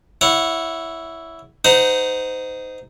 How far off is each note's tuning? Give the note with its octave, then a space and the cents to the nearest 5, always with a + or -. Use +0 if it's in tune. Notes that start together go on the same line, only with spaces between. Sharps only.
E4 +0 C#5 +30 F#5 -15
D#4 +0 C5 -25 F#5 +0